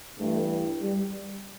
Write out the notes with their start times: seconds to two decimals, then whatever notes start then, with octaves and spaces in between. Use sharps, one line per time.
0.19 G2 E3 A3
0.82 G3